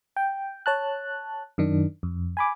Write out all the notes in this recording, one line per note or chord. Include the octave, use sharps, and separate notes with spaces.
G5
C#5 A5 F#6
F#2 D#3 D4
F2
G#5 B5 D6